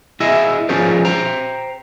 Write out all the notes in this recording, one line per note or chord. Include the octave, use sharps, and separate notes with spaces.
E4 G#4 D#5 E5
F3 C#4 G#4 A#4 C5 D5
C5 G5 A#5